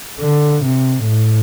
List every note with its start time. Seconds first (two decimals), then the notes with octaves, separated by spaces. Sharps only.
0.21 D3
0.64 C3
1.07 A2